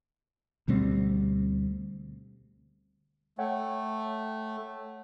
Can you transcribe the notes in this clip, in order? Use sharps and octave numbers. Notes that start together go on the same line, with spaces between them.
D2 B2 G3 C4
A3 C#5 F#5 G5